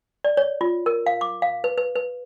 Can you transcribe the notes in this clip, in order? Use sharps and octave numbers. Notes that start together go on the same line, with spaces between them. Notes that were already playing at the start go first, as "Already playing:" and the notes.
D5
C#5
F4
A#4
F5
D6
F5
B4
B4
B4